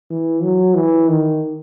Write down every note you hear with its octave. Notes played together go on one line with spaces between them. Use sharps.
E3
F#3
E3
D#3